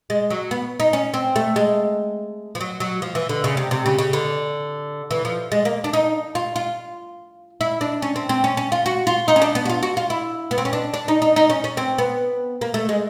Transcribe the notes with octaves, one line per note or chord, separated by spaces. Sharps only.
G#3
F#3
B3
D#4
C#4
C4
A3
G#3
F3
F#3
F#3
F3
E3
D3
C#3
C3
C3
C#3
C#3
D3
E3
F3
G#3
A#3
D4
D#4
F4
F4
E4
D4
C#4
C4
C4
C#4
C#4
F4
F#4
F4
D#4
C#4
D4
B3
F#4
F4
F#4
F4
E4
B3
C4
C#4
D4
D4
D#4
D#4
D#4
C#4
C#4
C4
B3
A#3
A3
G#3